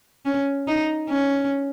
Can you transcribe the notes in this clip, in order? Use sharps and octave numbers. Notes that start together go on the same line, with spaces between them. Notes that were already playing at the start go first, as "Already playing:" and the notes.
C#4
D#4
C#4